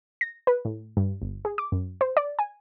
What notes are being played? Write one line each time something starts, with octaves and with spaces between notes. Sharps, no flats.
A#6
B4
A2
G2
G1
G#4
D6
F#2
C5
D5
G#5